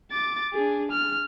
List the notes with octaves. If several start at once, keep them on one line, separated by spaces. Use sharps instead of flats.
D6 A6
D4 G#4
F6